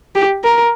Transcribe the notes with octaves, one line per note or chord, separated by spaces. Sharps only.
G4
A#4